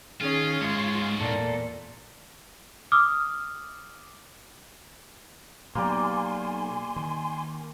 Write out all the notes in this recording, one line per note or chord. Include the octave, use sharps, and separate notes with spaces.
D#3 C#4 F4 G#4
G#2 G#3 F4 C#5
E2 A#2 A#3 A4
D6 D#6 F6
B2 F#3 A#3 B3 G4 D5 G#5 C6
D#3